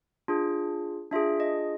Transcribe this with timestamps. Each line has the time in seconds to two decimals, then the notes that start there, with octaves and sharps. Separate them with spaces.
0.28 D4 F4 G#4
1.11 D4 F4 G#4 E5
1.40 D#5